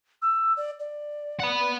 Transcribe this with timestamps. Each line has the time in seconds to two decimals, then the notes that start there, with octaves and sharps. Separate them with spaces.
0.22 E6
0.57 D5
0.80 D5
1.40 F#5 B5